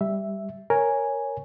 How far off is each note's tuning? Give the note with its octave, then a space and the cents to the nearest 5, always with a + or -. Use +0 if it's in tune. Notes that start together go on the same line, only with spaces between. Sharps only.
G3 +5 E5 +0
A#4 +0 C#5 +0 G#5 -5